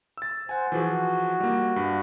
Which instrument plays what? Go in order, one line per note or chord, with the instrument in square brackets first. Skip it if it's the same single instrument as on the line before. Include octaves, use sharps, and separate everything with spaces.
[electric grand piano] E6 A6
[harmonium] C5 [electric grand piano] F#5 G#5
[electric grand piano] E3 F3 G#4 [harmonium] F#4
[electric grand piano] G3 A#3
G2